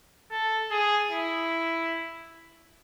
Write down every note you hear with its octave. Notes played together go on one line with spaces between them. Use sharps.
A4
G#4
E4